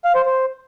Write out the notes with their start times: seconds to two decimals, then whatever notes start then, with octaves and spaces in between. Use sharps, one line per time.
0.05 F5
0.15 C5
0.26 C5